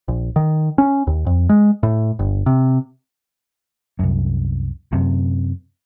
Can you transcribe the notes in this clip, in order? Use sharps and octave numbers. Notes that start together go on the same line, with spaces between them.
A#1
D#3
C#4
D#2
F2
G#3
A2
G1
C3
C2 F#2
F#2 C3